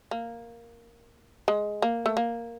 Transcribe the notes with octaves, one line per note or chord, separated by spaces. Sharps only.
A#3
G#3
A#3
A3
A#3